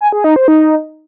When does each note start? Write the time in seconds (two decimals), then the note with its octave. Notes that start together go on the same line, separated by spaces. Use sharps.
0.01 G#5
0.12 G#4
0.24 D#4
0.36 C5
0.48 D#4